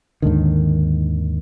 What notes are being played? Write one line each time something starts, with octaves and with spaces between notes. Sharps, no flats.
D#2 G#2 D3 D#3